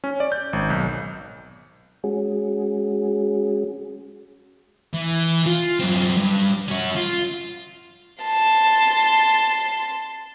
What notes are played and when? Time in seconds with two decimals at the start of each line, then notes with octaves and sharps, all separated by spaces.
0.04 C#4
0.20 D5
0.32 G6
0.53 G#1
0.70 B1
2.04 G#3 C#4 F#4 G#4
4.93 E3
5.46 F4
5.80 F#2 C4
6.17 G2
6.68 C#4 F#4
6.96 F4
8.23 A5 C6